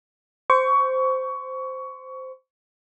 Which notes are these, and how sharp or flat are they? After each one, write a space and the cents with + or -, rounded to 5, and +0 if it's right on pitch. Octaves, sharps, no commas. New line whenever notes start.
C5 -10 C#6 +20